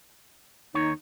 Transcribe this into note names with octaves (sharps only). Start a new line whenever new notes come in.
D#2 D#3 D#4 C#5